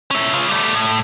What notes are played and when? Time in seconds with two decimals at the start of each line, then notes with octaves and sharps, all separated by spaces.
0.11 C#4 E4
0.33 C#3 F4
0.48 G3 A3
0.75 A2